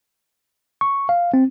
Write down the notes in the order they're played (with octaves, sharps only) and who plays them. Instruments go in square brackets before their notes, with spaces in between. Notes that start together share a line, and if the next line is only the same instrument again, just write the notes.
[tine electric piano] C#6
F5
C4